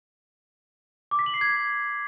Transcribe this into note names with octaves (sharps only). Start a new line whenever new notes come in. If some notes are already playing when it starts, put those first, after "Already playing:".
D6
B6
F#7
C7
G#6